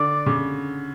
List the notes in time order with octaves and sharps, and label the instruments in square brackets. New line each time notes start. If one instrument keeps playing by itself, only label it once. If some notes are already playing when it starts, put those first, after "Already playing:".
Already playing: [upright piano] D3 [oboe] D5
[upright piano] C#3